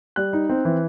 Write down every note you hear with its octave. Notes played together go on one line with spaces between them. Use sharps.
G3 F#6
D#4
C4
E3